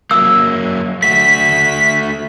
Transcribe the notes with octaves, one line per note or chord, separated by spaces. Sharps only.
F#3 A#3 E6
A3 F#4 B6